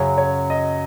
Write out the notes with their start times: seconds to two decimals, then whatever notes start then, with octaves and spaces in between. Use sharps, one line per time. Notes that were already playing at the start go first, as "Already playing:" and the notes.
Already playing: F#2 C#3 F#3 C#4 C#5
0.18 C#5
0.50 D#5